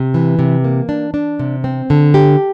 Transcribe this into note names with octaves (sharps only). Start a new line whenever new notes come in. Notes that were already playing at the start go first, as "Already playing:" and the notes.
Already playing: C3
E3
C3
A#3
D4
D4
C3
C4
D3
G4